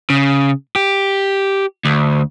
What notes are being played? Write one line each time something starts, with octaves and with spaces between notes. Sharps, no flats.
C#3
G4
D2